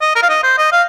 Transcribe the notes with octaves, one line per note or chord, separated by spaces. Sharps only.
D#5
A#4
F5
D#5
C5
D#5
F5